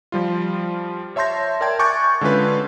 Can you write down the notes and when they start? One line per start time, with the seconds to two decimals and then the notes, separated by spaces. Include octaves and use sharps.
0.12 F3 G3 F4
1.16 C#5 E5 A5 C6 G6 A#6
1.61 A#4 D5 E5 G5 A5 G#6
1.79 G#5 C#6 D6 F#6 G6 A6
2.21 D3 G#3 C#4 F4 B4